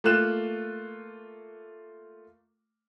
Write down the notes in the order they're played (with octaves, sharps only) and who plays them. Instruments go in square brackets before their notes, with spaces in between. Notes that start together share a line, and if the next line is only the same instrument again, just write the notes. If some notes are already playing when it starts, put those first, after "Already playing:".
[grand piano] A3 A#3 F4 F#6 E7